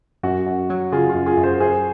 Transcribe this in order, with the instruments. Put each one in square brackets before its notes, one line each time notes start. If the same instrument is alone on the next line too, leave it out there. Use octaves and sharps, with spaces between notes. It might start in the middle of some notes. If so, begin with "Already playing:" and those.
[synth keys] F#2 [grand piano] F#4
[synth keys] F#2
F#3
[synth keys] C#3 [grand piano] F4 G#4
[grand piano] F4
[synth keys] F#2
[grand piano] F4 G#4
[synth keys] F#2
[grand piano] G#4 C5
[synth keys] F#2 [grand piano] G#4 C5